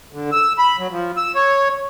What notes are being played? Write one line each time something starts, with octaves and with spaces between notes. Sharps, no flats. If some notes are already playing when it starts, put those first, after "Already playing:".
D3
E6
B5
F#3
F3
E6
C#5